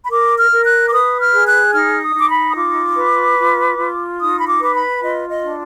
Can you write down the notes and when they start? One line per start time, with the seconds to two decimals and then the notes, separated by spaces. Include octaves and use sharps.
0.04 B5
0.09 A#4 D6
0.37 F6
0.51 A#4
0.64 F#6
0.86 D6
0.91 B4 D#6
1.18 F6
1.32 G#4
1.46 F#6
1.73 D#4 F6
2.01 D#6
2.14 D#4
2.19 D6
2.28 B5
2.49 D#6
2.55 F4 D6
2.96 B4
3.38 F4
3.78 F4
4.19 D#4 D#6
4.39 B5
4.46 D6
4.60 B4 D6
4.74 B5
5.01 F4 D#5
5.28 D#5
5.42 D4